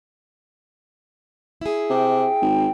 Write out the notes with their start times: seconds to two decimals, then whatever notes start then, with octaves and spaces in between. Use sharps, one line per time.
1.61 E4 G#4
1.90 C3 G5
2.42 G#1